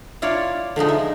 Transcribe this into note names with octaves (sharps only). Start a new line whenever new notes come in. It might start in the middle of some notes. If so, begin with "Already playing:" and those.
E4 F4 C#5 D5
D3 F3 G#3 D#4
E5